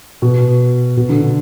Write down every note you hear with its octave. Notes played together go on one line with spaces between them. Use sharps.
B2
B2
D3
D3